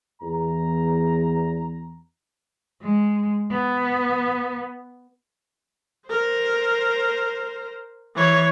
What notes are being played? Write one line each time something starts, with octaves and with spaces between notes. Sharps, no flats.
E2 A#5
G#3
B3
A#4 C5
E3 C#5